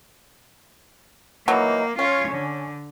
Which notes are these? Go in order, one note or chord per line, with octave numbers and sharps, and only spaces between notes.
E3 F#3 A#3 D#4
C#4 F4 C#5
D3